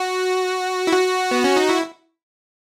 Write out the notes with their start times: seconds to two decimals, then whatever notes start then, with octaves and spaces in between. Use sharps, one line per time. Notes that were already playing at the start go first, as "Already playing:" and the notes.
Already playing: F#4
0.87 E4
0.92 F#4
1.31 B3
1.44 C#4
1.57 D#4
1.69 E4